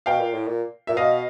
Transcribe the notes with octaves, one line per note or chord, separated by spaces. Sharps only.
B2 F5 G5
A#2
A2
A#2
A#2 E5
B2 D#5 F5